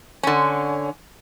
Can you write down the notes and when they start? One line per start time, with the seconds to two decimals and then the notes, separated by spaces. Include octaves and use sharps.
0.23 D3 C#4